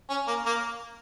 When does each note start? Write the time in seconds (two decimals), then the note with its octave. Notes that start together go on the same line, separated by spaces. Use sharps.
0.09 C#4
0.28 A#3
0.46 A#3